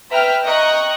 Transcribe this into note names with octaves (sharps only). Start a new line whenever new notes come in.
B4 E5 G5 A#5 F6
D#5 G5 A#5 C#6 F#6